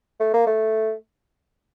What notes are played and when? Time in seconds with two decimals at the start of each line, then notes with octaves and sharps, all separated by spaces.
0.20 A3
0.34 A#3
0.47 A3